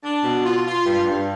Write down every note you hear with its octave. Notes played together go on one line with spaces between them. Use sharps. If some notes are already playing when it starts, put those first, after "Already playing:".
D4
B2
F4
F4
G2
G2